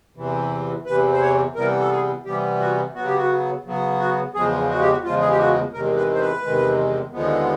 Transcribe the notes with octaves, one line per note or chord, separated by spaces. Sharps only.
E2 C3 E3
E2 C3 E3 B4
C5
C#5
C3 E3 G3 B3 A#4
A4
G#4
C3 E3 G3 B3 G4
F#4
C#3 F#3 B3 F#4
G4
F#4
C#3 F#3 B3
F#4
E2 C#3 F3 G#3 G#4
F#4
G4
F#4
E2 C#3 F3 G#3 F4
G#4
G4
F#4
E2 C3 D#3 G#3 A#4
B4
C5
B4
E2 C3 D#3 G#3
D#2 D3 F3 G#3 B3